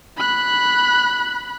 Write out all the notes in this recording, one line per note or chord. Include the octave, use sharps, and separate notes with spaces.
B5 F#6